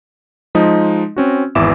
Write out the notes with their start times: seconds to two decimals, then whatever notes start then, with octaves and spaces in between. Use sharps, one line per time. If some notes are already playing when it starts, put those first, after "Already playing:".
0.55 F3 G#3 D#4 D#5
1.16 C4 C#4 F#4
1.55 G#1 E2 E3 E5 D6 E7